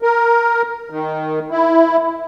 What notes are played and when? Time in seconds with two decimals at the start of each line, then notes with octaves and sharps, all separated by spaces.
0.02 A#4
0.90 D#3
1.51 E4